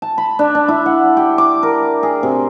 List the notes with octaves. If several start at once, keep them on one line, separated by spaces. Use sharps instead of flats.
A5
B5
D4
D4
E4
F#5
G4
D6
A#4
G#4
C3